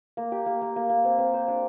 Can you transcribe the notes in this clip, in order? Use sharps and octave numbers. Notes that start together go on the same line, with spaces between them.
A#3
G4
A#3
A#3
A#3
A#3
C4
C4
C5
D4